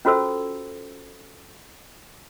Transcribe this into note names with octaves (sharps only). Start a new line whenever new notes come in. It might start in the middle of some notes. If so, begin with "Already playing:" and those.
C#4 F4 F#4 A4 C5 E6